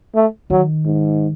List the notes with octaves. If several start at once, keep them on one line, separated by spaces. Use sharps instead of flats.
A3
D#3 F#3
G#2